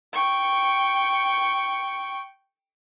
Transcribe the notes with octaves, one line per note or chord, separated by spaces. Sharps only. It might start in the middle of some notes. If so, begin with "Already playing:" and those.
G5 C#6